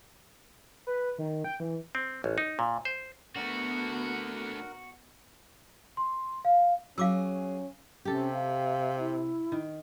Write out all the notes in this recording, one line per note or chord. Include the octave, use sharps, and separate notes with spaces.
B4
D#3
G5
E3
C4
A1
D#4
A#2
C5
D3 A3 B3 F#4 A#4 F#5
C6
F5
F#3 C#4 G#4 F5 D6 E6
C3 C#4 G4 A4
F5
E4
D#3